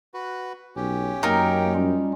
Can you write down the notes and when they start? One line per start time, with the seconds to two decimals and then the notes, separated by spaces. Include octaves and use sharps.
0.14 F#4 B4
0.76 B1 C#4 G4
1.23 F#2 A#3 D#4 A#4 G5
1.75 G3 C#4 F4